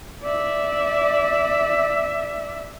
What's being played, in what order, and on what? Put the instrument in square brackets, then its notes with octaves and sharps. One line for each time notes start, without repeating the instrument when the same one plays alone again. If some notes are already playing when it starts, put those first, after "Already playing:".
[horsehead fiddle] D5 E5